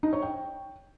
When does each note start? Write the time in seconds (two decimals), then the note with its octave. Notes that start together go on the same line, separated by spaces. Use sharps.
0.03 D#4
0.13 C#5
0.22 G5